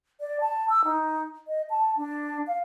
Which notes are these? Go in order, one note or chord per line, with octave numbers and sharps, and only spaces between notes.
D5
A5
E6
D#4
D#5
A5
D4
F5